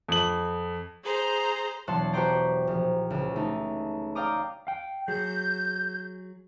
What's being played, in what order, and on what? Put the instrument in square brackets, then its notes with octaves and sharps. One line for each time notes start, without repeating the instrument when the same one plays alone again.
[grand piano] F2 F#7
[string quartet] G#4 C5 A#5
[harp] E1 F#3 F#5 A5 C6
F#4 G4 B4 C5 G5 A#5
A#1
C#2
A3 D#4
D5 F5 G5 A#5 D6 D#6
[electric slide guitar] F5 G5
[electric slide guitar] F#3 G#4 [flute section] G6